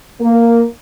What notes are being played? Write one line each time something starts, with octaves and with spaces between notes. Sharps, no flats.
A#3